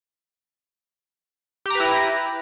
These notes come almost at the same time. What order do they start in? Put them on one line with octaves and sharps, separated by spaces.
G4 A#5 B4 E4